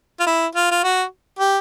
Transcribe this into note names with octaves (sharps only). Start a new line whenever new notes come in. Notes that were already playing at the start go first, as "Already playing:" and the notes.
F4
E4
F4
F4
F#4
G4